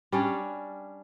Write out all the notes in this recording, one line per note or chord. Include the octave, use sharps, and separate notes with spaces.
G3 C#4 D4